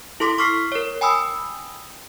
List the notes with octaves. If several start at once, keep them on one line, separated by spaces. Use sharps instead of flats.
E4 A4 C6 D6 B6
C#6 D6 F6 B6 C7
A#4 C#5
G5 G#5 B5 D#6 E6